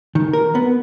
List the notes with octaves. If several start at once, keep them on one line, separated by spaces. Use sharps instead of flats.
D#3
A#4
B3